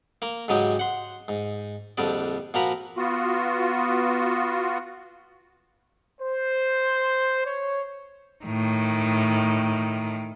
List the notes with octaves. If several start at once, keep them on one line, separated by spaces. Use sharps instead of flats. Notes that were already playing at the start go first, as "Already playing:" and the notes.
A#3 A#4
G#2 C#3 F#3 G#3 G4
F#5 C6
G#2
A#1 F2 D3 G3 D5
A#2 F3 F#4 A#4 A#5 B5
B3 F4 F#4
C5
C#5
A2 D#3